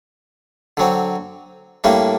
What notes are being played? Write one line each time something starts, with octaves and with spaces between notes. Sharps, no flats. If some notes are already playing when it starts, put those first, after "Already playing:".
D3 F#3 C4
A2 G3 A#3 D4